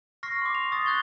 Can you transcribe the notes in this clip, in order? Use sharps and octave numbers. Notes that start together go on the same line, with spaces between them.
C#6 F6 A#6 C7
C6 D6
F7
C#6 D#6 A6
D#6 F#6 G#6 G7